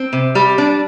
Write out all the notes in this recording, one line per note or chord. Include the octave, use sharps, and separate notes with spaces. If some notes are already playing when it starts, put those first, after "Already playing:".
Already playing: C4
C3
G3
D4